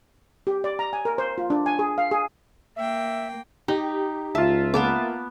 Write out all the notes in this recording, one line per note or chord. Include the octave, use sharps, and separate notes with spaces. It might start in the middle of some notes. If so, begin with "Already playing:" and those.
G4
D5
A#5
G#5
A#4
C5
F4
D4
G#5
G#4
F5
G#4
A#3 E5 G5
D#4 G4
C#2 F4 E5 A5
A#3 B3 A5 D6